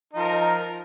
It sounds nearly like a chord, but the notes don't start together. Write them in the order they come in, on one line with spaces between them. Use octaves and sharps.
D#4 F3 A#4